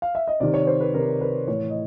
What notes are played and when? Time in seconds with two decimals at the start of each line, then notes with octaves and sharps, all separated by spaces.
0.02 F5
0.15 E5
0.28 D#5
0.40 C3 D#3 D5
0.54 C#5
0.67 C5
0.80 B4
0.94 C3 D#3 A#4
1.21 B4
1.48 A2 E3 C#5
1.70 D#5